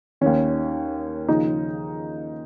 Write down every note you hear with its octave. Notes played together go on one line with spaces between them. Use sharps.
D#2 D#3 C#4
D#2 C#3 F3 D#4